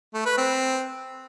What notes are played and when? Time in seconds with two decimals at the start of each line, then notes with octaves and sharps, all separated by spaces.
0.14 A3
0.26 B4
0.38 C4